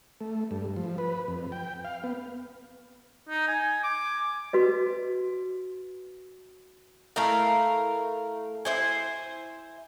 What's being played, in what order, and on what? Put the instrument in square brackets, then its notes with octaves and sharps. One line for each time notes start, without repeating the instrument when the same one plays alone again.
[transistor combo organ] A3
G2
F3
B4
F2
G5
F5
B3
[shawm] D#4
G#5
D6
[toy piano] F#4 B4 D#5
[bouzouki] A3 E4 A#4 F5
E4 C5 G#5